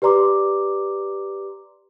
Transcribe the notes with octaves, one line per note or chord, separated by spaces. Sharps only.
G4 B4 D5 A#5 C6 D6